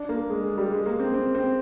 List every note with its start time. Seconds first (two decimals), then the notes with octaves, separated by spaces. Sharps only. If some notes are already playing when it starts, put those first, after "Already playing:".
Already playing: D4
0.09 A#3
0.30 G#3
0.44 G#3
0.58 G3
0.72 G#3
0.86 A#3
1.00 C4
1.14 C4
1.35 C4